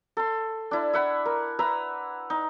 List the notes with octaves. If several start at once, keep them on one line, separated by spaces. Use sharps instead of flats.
A4 C6
D4 E4
E5 F#5 B5
A#4
B4 E5 A#5
D#4